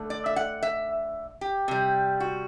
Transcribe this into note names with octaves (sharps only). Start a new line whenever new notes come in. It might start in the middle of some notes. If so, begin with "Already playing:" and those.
Already playing: D3 A3
D5
E5
F#5
E5
G4
C3 G3
F#4